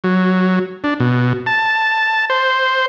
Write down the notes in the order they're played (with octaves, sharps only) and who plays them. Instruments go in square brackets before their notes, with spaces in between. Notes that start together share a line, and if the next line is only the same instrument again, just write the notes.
[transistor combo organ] F#3
D4
B2
A5
C5